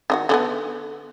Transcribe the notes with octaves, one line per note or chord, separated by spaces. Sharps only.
D#3 D#4 F#4
D3 G#3 B3